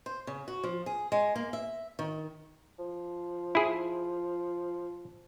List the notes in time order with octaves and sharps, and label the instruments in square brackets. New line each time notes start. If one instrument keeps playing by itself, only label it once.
[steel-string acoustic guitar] C5
C#3
F#4
F3
G#4
G#3
A#3
E5
D#3
[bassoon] F3
[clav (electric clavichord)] E4 G#4